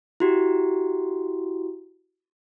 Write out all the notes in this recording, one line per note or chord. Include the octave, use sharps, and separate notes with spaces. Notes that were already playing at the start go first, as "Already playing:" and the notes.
E4 F#4 G4